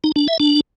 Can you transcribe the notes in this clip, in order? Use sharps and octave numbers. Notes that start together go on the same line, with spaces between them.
D#4
D4
E5
D4